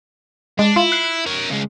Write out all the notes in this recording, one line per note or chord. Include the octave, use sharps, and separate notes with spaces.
G#3 D4
E4 F4
F#6 C7
A#4 C#5
C#3 G#3